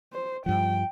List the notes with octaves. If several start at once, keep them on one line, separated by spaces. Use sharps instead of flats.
C5
G2 F3 G5